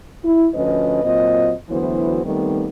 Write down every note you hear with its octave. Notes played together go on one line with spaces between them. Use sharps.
E4
D2 F3 C#4 B4 D#5
A#2 F#3 C4 F4 D#5
D2 E3 F#3 B3 E4 C5
D#3 G3 A3 B3 C4 D#4